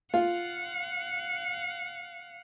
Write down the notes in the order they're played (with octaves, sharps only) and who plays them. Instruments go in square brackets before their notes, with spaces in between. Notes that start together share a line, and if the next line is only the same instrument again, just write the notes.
[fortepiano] F4 [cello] F5 F#5